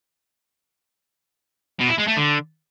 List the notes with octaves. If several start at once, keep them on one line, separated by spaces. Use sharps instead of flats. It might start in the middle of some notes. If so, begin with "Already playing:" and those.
B2
E4
G#3
A3
D3